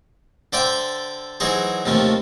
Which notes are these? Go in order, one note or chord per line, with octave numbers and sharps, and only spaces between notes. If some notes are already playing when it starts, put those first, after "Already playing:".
D3 C5 D5 E5 G5 C6
E3 F#3 D#4 G#4 C5
D#2 C3 F3 A3